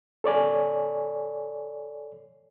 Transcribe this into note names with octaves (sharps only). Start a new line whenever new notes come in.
A4 C#5 D5 G#5